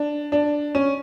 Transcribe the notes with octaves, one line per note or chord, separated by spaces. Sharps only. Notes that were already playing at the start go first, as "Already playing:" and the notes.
Already playing: D4
D4
C#4